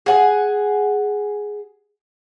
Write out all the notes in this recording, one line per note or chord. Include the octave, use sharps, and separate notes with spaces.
G#4 F#5